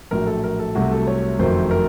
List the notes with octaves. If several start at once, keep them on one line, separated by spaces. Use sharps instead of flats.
A#1 A2 F#3 A#4
A4
A#4
A4
C2 C3 F#3 A3 F#4
A4
C#5
F#1 F2 D#3 F#3 A3 C5
A#4